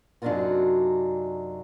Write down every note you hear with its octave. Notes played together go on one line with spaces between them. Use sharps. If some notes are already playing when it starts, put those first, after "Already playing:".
F#2 C3 D4 D#4 F4 F#4